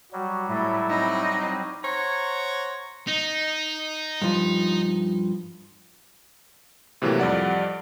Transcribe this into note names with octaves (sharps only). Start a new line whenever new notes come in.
F#3 G3 F#4
A2 A3 E4
C4 D#4
C5 C#5 F#5 A#5
D#4
G2 F3
A2 C3 E3 F#3 A#3
F2 G3 D5 F#5